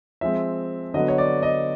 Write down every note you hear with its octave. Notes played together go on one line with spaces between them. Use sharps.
F3 G#3 C4 E5
D3 F#3 B3 D#5
C#5
D5
D#5